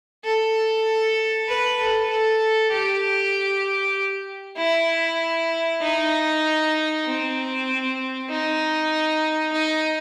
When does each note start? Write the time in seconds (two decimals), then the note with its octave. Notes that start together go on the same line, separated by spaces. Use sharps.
0.24 A4
1.48 B4
1.78 A4
2.10 A4
2.71 G4
4.57 E4
5.82 D#4
7.06 C4
8.29 D#4
9.53 D#4